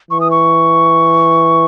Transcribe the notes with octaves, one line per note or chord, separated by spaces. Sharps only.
E3 C#6
D#6
C#6